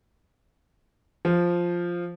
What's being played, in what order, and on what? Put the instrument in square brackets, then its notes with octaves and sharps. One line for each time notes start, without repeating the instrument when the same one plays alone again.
[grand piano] F3